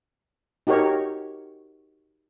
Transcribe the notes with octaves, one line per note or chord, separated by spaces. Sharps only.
D#4 F#4 G4 A#4 C#5